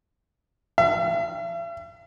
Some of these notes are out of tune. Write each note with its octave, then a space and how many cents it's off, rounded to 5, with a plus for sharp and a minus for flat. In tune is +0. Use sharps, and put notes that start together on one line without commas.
E5 +45